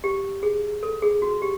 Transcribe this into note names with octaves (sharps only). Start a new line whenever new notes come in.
G4
G#4
A4
G#4
F#4
G4